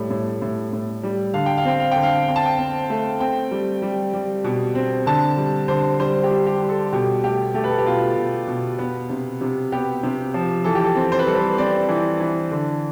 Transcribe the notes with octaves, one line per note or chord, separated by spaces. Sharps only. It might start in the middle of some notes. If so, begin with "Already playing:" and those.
Already playing: A2 G3
A2
A2
A2
G3
D3 F5
G5
F5
C4 G5
F5
D3 G5
F5
C4 G5
A5
G5
C4
A3
C4 G5
G3
G3
G3
B2
C4
D3 A5
G3
D3 C5
G3 C5
G4
G3
G4
G3
A4
B2 G4
A3 G4
A3 G4
B4
A4
G4
B2 F4
B2
B2
B3
C3
C3
B3 G4
C3
F3
E3 A4
G4
A4
C4
C5
B4
G3 A4
B4
C4 D5
E3
E3
D3